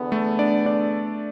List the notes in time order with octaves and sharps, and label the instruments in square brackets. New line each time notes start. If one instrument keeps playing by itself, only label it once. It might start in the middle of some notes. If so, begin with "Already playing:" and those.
Already playing: [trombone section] E2 D3 B3
[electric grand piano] A3 A4
D4 D5
D4 D5